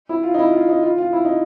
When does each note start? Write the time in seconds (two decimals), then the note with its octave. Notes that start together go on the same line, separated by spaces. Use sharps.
0.09 E4
0.23 F4
0.34 D#4
0.39 E4
0.53 F4
0.69 D#4
0.82 F4
0.98 F4
1.13 E4
1.25 D#4